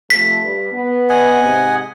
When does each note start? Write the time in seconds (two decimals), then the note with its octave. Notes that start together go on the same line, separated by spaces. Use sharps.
0.10 C3 F3 A3 B6
0.43 G2
0.72 B3
1.09 D#5 F#5 G#5
1.42 G#2 C3